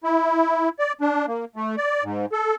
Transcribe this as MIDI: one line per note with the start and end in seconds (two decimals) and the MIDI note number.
0.04 0.69 64
0.79 0.93 74
1.01 1.26 62
1.28 1.45 58
1.56 1.76 57
1.77 2.04 74
2.04 2.26 44
2.32 2.55 69